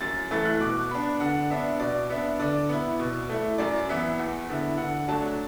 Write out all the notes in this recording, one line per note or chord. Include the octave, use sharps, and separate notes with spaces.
F#2 A6
E3 A3 E4 A6
F#6
B2 D6
B3 D4 B5
D3 F#5
B3 D4 E5
B2 D5
B3 D4 E5
D3 D5
B3 E4
B2
A3 E4
F#2 D5
E3 B3 E5
E2
D3 B3 E4
D3 F#5
F#3 A3 D4 A5